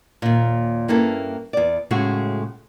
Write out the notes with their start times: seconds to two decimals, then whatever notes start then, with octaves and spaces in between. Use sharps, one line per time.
0.22 D#2 A#2
0.88 G2 A#3 C#4 E4 A4
1.53 E2 D5
1.91 A2 C#3 G#3 A3 E4 F#4